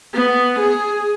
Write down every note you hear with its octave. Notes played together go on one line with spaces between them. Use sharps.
B3
G#4